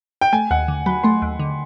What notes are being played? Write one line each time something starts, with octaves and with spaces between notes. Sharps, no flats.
G5
A3 G#5
D#2 F#5
D3
F#3 B5
A3 C6
D#2
D3